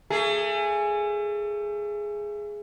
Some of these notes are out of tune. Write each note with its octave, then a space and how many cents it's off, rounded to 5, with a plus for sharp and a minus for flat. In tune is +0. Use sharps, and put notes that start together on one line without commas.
A3 +30 G#4 +0